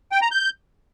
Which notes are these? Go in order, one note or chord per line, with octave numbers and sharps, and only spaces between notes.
G5
A#5
G6